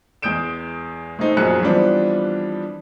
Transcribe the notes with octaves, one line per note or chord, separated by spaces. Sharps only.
E2 G#3 D#6 G6 D7 E7
G#3 A3 C4 D#4
A#1 F#2 C4 G#4 F#6 C#7
E3 F3 G3 B3 C4 D4